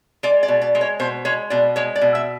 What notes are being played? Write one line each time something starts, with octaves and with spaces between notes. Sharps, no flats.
G#3 D5
D5
B2
D5
G#3
C#5
B2 C5
G#3 C#5
B2 D5
G#3 C#5
D5
B2
E5